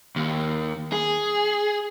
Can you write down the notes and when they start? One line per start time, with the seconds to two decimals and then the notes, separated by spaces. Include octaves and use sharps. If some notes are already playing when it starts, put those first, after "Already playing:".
0.16 D#2
0.92 G#4